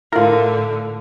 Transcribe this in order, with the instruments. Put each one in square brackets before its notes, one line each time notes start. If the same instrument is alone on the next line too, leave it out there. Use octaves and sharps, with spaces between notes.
[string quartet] A2 D3 [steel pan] E4 F4 [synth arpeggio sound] A#4